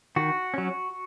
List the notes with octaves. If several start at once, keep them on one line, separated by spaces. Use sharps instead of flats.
D#3 F#4
F#3 C#4